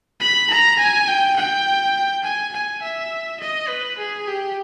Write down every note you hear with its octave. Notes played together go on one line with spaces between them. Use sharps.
B5
A#5
G#5
G5
G5
G#5
G#5
E5
D#5
B4
G#4
G4